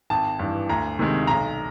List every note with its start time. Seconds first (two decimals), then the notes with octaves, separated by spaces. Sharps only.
0.10 G#1 A5
0.39 G2 E3
0.69 D2 A#5
0.99 C3 D#3 G#3
1.27 B1 A#5